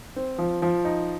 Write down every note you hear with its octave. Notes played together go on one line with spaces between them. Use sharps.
C4
F3
F3
D#4